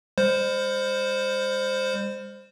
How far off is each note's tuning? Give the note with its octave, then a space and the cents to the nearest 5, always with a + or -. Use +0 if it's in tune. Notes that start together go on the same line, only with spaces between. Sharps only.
G3 +45 C5 +0